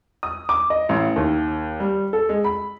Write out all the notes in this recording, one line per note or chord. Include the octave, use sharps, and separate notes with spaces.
D#6
D6
D#5
A1
D#2
G3
A4
G#3
B5